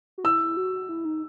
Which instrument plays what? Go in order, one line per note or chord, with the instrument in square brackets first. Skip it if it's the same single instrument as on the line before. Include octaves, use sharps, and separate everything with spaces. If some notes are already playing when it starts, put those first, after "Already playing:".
[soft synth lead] F#4
[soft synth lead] E4 [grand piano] E6
[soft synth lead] F#4
E4
D#4